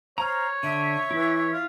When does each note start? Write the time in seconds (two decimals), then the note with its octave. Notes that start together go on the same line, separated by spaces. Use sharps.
0.18 C5 C#5 A#5 F6
0.63 D3 E5
1.11 E3 E4
1.52 F4